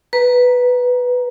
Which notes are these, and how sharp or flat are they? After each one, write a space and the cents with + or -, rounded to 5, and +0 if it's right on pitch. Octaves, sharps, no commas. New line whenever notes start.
B4 +0 A#5 +10